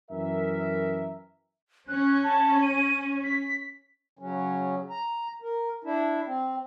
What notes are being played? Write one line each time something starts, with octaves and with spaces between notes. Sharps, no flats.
F#2 E3 A#4 E5
C#4 F#6
A5
D#7
B6
C#3 F#3 C#4
A#5
A#4
D4 E4
C4